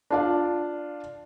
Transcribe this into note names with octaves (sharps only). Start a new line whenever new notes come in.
D4 F4 D5